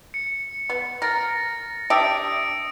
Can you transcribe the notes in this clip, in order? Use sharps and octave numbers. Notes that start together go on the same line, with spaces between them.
C#7
B3
A#4 A6 A#6
D4 G4 E5 D#6 D7